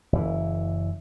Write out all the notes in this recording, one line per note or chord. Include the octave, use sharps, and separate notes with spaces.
F#1 E3